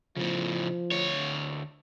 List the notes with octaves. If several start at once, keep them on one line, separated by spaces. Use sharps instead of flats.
A2 C#3 F3
D2 C#5